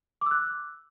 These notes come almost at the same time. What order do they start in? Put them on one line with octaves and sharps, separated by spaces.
D6 E6 F#6